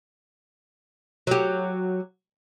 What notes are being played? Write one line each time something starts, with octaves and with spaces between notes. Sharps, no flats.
F#3 G4